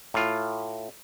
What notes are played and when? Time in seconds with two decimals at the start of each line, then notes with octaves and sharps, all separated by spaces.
0.14 A2 F4